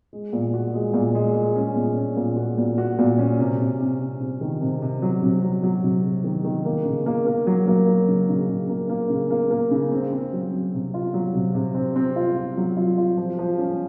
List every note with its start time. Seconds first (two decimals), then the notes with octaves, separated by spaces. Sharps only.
0.13 G#3
0.33 A#2
0.54 F#4
0.74 G#3
0.94 A#2
1.15 G#3
1.35 G#3
1.56 C#4
1.76 A#2
1.97 C#4
2.17 A#2
2.37 F#4
2.58 A#2
2.78 F#4
2.99 A#2
3.18 C#4
3.39 C3
3.59 C3
3.80 C3
4.00 C3
4.21 C3
4.41 D#3
4.61 C3
4.82 C3
5.02 F#3
5.23 C3
5.43 F#3
5.63 F#3
5.84 C3
6.04 C3
6.24 D#3
6.44 D#3
6.65 A#3
6.85 C#3
7.06 A#3
7.27 A#3
7.47 F#3
7.67 A#3
7.87 F#3
8.08 C#3
8.29 C#3
8.49 C#3
8.69 A#3
8.90 A#3
9.10 C#3
9.31 A#3
9.51 A#3
9.71 C#3
9.92 C4
10.13 C4
10.33 F#3
10.53 C4
10.74 C3
10.94 F4
11.14 F#3
11.34 C3
11.54 C3
11.74 C4
11.96 C4
12.16 F4
12.36 F4
12.57 F#3
12.77 F4
12.98 F4
13.17 F3
13.39 F3
13.59 C#4